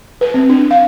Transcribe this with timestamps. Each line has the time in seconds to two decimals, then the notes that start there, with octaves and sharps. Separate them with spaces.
0.21 B4
0.34 C4
0.49 D4
0.71 F5